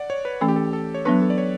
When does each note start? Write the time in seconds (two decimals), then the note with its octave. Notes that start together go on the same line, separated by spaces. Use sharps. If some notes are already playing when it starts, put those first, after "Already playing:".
Already playing: D5 F#5
0.10 C#5
0.25 B4
0.41 E3 A3 C#4 A4
0.48 G4
0.56 A4
0.73 A4
0.94 C#5
1.05 F#3 B3 D4 B4
1.21 A4
1.30 D5
1.38 C#5